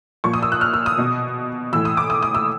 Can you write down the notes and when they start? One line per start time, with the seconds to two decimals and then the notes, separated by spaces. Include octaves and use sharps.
0.24 A#2 F3 C#6
0.33 D#6
0.42 E6
0.52 F#6
0.61 F6
0.74 E6
0.86 D#6
0.98 B2
1.73 A2 E3 E6
1.85 D#6
1.97 D6
2.10 D#6
2.23 D#6
2.35 E6